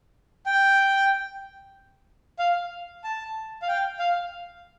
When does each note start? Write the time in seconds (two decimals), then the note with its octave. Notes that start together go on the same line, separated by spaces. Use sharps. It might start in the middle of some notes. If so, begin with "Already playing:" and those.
0.46 G5
2.39 F5
3.04 A5
3.62 F5
3.68 G5
3.99 F5